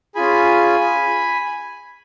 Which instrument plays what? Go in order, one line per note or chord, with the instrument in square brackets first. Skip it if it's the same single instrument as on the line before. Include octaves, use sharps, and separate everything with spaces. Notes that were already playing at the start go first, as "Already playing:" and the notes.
[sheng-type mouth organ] C#4 F4 G#4 G#5 B5